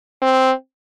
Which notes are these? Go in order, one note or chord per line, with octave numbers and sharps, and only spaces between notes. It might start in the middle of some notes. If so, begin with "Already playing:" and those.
C4